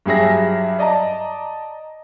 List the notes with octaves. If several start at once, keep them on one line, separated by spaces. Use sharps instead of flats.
G2 F#3 G4 G#4 E5 A#6
D5 D#5 A5 A#5